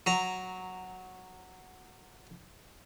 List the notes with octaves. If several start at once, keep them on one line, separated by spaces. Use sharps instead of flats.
F#3 A#5